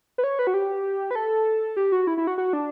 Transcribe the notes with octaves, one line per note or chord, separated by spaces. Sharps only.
B4
C#5
B4
F#4
G4
B4
A4
G4
F#4
E4
E4
F#4
F#4
D4